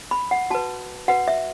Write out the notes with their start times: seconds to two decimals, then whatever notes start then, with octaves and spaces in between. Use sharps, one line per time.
0.11 B5
0.31 F#5
0.50 F#4 B4 A5
1.08 F#4 B4 F#5
1.28 E5